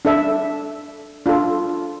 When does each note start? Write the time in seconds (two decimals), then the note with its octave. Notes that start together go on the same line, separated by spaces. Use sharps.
0.05 D4 A4 E5
1.26 D4 F4 A4